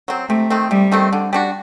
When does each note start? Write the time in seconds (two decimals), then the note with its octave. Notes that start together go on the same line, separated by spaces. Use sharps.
0.08 F#3 C4
0.29 C3 A3
0.50 D#3 A3 C4
0.71 C3 G3
0.92 D#3 A3 C4
1.13 D3
1.33 G3 D4 F#4